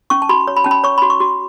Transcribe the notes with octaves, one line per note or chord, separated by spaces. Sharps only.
C#4 C#6
A5
F#4 B5
C#5
B5
C#4 A5
B5
C#5 C#6
F#4 B5
C#6
F#4